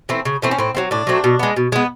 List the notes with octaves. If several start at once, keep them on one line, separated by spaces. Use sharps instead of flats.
E3 A3 C4
C#3
E3 A3 C4
C#4
A2 C4
F#3 A3 C4
A2 D4
F#3 A3 C4
B2
G#3 B3
B2
G#3 B3